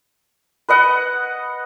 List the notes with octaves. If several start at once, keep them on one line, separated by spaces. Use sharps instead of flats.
B4 D#5 F#5